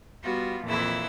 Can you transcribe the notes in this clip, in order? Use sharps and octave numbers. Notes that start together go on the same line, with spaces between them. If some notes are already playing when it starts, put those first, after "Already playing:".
G3 B3 F4 F#4
F2 A#2 E3 E4 E6